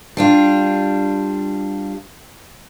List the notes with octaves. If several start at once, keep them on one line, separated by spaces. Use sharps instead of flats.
G3 D4 F4